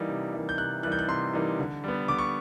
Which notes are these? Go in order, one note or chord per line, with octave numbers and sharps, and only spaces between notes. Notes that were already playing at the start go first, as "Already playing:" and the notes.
Already playing: E3 G3 A#3 D#4
C3
E3 G3 A#3 D#4
G6
C3 F#6
E3 G3 A#3 D#4 F#6
G6
F#6
C3 C6
E3 G3 A#3 D#4
D3
G3 B3
D3 D6
C#6